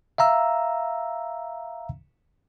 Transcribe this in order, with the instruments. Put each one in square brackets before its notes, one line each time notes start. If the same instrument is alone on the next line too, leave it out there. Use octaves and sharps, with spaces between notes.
[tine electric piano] E5 F5 A#5 E6